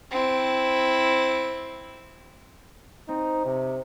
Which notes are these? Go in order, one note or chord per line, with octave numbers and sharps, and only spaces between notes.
C4 E4
C4 D#4
C3